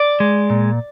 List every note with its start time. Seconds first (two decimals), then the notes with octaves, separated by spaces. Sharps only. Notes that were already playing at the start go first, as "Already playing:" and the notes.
Already playing: D5
0.20 G#3
0.50 A#2